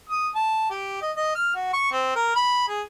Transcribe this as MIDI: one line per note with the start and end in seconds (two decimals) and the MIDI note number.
0.10 0.29 87
0.35 0.66 81
0.70 0.99 67
1.02 1.12 75
1.17 1.32 75
1.36 1.52 89
1.55 1.69 66
1.73 1.91 85
1.93 2.12 60
2.16 2.31 70
2.36 2.67 83
2.69 2.81 68